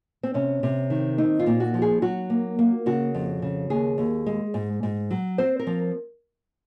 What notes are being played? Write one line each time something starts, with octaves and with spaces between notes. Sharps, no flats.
C4
C3 C#4
C3
D#3
C4 D#4
F4
A#2
F#4
F3
G#4
F#3 F#4
A#3
A#3
C#3 F#4
F2
C#3
D#2 G#4
D#2
G#3
G#2
G#2
F#3
C4 C5
A#4
F3